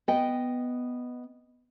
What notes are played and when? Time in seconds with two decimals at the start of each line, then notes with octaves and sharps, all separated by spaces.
0.08 B3 D#5 G5